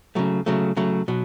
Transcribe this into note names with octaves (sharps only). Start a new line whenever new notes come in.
C#3 F#3 A3
C#3 F#3 A3
C#3 F#3 A3
B2 F#3